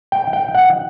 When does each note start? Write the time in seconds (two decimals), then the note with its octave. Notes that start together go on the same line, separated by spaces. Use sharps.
0.12 G5
0.33 G5
0.55 F#5